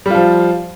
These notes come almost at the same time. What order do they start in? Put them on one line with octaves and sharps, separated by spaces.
G3 F4 F3